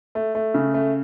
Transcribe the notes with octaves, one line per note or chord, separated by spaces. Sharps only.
A3
A3
C#3
A3